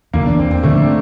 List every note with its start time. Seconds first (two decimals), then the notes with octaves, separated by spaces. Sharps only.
0.14 F1 E2 D3 A#3
0.26 D4
0.39 C4
0.51 C4
0.63 D2 D3 F3 A3 C4
0.80 D4